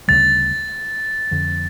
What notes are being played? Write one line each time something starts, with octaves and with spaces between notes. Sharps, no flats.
D2 C#3 G3 A6
F2 D3 F3